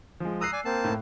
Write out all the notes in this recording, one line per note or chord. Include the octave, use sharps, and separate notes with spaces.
F3 G#3
A#5 D#6 E6 F#6 C7
D5 G#5
A#3 C4 A5
A2